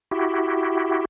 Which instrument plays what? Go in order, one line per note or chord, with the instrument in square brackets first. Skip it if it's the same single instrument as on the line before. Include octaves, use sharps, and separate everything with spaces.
[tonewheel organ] E4 F#4 G4